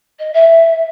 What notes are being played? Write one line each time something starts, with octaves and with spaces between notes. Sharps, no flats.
D#5
E5